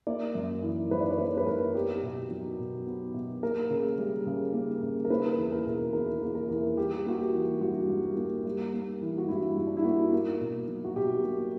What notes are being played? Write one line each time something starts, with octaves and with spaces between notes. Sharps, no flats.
A#3 D5
F#2
E3
F#2 B4
D5
C#5
A#3 B4
B4
F#2 A#4
B3 G4
B2
F#3
B2
B3
B2
A#3 A#4
C#3
G3
C#3
A#3
C#3
A#4
A#3 B4
E2
A#4
B2
E2 A#4
A#3
A#4
E2
G3 G4
A#3 F#4
G4
E3
G2 F#4
G3
A#3
G3
A#3
E3
F#4
G2 E4
G3
D4
E4
A#3 F#4
A#3
B2
F#3
F#4
B2 G4
A#3